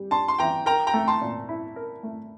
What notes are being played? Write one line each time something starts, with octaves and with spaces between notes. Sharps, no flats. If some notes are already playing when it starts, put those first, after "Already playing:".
Already playing: G3
D4 A5 C6
C6
E3 G5 A#5
A#4 G5 A#5
G5 A#5
A3
A5 C6
A#2
E4
A#4
A3